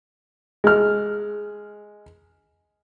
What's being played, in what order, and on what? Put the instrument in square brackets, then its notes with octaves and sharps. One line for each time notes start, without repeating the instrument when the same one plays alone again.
[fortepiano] G#3 F6